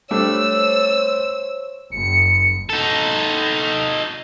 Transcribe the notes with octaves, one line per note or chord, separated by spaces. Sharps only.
G3 A3 D4 C5 C#5 E6
F#1 C#7
D#4 A4